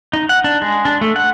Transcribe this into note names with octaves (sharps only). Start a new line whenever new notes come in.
D#4
F#5
D4
G#3
D4
A3
F#5